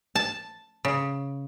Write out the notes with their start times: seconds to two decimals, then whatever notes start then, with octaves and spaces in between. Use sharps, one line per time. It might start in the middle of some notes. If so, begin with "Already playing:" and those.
0.15 A5
0.85 C#3